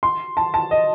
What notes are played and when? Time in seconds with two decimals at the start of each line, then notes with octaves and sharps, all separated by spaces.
0.03 C6
0.37 A5
0.54 A5
0.71 D#5